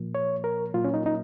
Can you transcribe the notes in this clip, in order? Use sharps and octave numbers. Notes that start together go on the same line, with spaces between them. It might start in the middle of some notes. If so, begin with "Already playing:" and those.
Already playing: A#2 F3 A#3
C#5
A#4
A#2 F#3 A#3 F4
C#4
D#4
D#4